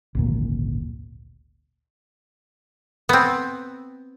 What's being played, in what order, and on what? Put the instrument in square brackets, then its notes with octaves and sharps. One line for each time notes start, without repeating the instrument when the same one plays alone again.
[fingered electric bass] G#1 D2 A#2
[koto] B3 C4